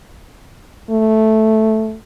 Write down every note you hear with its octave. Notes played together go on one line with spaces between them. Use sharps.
A3